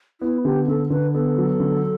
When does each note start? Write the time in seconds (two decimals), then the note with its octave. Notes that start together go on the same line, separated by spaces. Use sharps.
0.21 B3 E4
0.44 D3 G4
0.67 D3 A4
0.90 D3 B4
1.14 B3 A4
1.38 F#3
1.60 D3